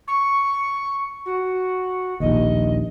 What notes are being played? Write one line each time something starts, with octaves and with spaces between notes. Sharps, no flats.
C#6
F#4
A#1 D#2 D#5